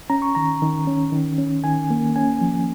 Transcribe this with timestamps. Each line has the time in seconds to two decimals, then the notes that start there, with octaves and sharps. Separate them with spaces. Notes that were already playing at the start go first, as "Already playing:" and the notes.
0.10 C#4 A#5
0.22 C#6
0.35 D#3 A#5
0.62 D#3
0.87 C#4
1.12 D#3
1.38 C#4
1.64 D#3 G#5
1.90 A#3
2.16 C#4 G#5
2.41 F3